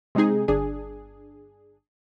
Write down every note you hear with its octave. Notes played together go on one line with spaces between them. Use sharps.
C3 G#3 C4 D#4 G#4
G1 D4 G#4